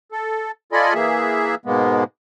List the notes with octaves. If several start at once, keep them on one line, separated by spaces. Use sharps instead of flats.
A4
F4 A4 D5 D#5 G#5 B5
E3 A#3 G#4 E5
G#2 B2 G#3 A#3 B3